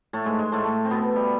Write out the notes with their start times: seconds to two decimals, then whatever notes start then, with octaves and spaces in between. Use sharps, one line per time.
0.13 A2 A3
0.26 G#2 G#3
0.39 G#2 G#3
0.52 A2 A3
0.64 A2 A3
0.85 C4
0.91 B2 B3
1.16 G3